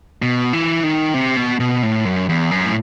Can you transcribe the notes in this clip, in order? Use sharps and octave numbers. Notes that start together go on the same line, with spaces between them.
B2
E3
D#3
C3
B2
B2
A2
F#2
E2
F#2
A2